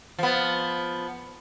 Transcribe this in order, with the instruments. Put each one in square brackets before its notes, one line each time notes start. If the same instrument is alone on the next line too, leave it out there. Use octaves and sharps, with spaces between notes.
[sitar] F3 B3